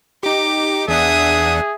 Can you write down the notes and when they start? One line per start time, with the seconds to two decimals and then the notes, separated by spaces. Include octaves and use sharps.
0.23 D#4 G4 D6
0.88 E2 D4 G#4 E5 F#5 D#6